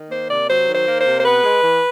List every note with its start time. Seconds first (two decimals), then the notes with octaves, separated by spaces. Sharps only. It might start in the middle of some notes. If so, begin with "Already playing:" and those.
Already playing: D#3
0.10 A#3 C5
0.29 C3 D5
0.48 F#3 C5
0.67 D#3
0.74 C5
0.86 A#3
0.99 C5
1.05 C3
1.18 C5
1.24 B3 B4
1.44 G#3
1.62 E3